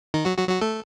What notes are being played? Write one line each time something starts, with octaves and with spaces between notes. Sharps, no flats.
D#3 D#4
F#3 F#4
F#3 F#4
F#3 F#4
A3 A4